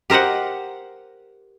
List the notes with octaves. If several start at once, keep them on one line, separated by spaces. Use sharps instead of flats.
G4 A#4 C5 D#5 F#5